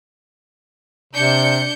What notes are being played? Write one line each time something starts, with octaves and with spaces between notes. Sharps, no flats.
C3 D4 G6 C#7